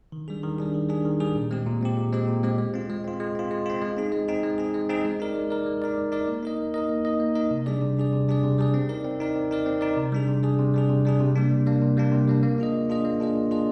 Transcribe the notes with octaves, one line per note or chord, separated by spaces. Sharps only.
D#3
G3 D4 G#4
D#3
G3 D4 G#4
D#3
G3 D4 G#4
D#3
G3 D4 G#4
A#2
G#3 C4 G4
A#2
G#3 C4 G4
A#2
G#3 C4 G4
A#2
G#3 C4 G4
G#3
C4 F4
G#3
C4 F4
G#3
C4 F4
G#3
C4 F4
G#3
C4 D#4 G#4
G#3
C4 D#4 G#4
G#3
C4 D#4 G#4
G#3
C4 D#4 G#4
G#3
D#4 A#4 D5
G#3
D#4 A#4 D5
G#3
D#4 A#4 D5
G#3
D#4 A#4 D5
A#3
D#4 A#4 D#5
A#3
D#4 A#4 D#5
A#3
D#4 A#4 D#5
A#3
D#4 A#4 D#5
C3
G3 D4 G#4 D5
C3
G3 D4 G#4 D5
C3
G3 D4 G#4 D5
C3
G3 D4 G#4 D5
C4
D#4 A#4 D5
C4
D#4 A#4 D5
C4
D#4 A#4 D5
C4
D#4 A#4 D5
C3
G3 D4 G#4
C3
G3 D4 G#4
C3
G3 D4 G#4
C3
G3 D4 G#4
C3
G3 A#3 D4
C3
G3 A#3 D4
C3
G3 A#3 D4
C3
G3 A#3 D4
A#3
D4 F4 G#4 D#5
A#3
D4 F4 G#4 D#5
A#3
D4 F4 G#4 D#5
A#3
D4 F4 G#4 D#5